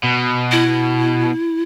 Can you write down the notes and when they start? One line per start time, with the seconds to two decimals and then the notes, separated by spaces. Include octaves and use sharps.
0.04 B2
0.51 E4